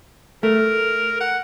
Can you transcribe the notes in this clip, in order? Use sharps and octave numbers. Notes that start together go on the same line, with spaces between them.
A3 A#4
F#5